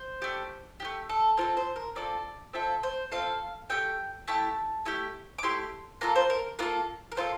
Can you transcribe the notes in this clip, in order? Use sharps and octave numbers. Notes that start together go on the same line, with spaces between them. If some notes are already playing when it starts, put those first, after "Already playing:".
Already playing: C5
A3 D4 G4
A3 D4 G4
A4
C4 F4 A4 A#4
C5
A#4
C4 F4 A4 D5
C4 F4 A4 E5
C5
C4 F4 A4 F5
A3 E4 G4 G5
A3 E4 G4 A5
A3 E4 G4
D6
A3 E4 G4 C6
A#3 F4 A4 A#5
C5
A#4
A#3 F4 A4 A#4
A#4
A#3 F4 A4 C5